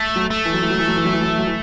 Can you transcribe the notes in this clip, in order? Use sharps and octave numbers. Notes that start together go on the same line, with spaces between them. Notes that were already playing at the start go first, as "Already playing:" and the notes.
Already playing: A3
F#3
A3
E3
F#3
E3
F#3
E3
F#3
E3
F#3
E3
F#3
E3
F#3
E3